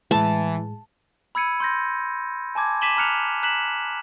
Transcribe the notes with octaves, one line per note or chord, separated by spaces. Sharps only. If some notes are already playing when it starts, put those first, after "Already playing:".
A2 E3 G#3 A5
B5 E6 G#6 C#7 D#7
C6 G6 A#6
G#5 A5 D6 G#6
D6 B6 D#7 E7 F#7 G7
A#5 F6 F#6 C#7 F7
A#5 F#6 B6 E7 F#7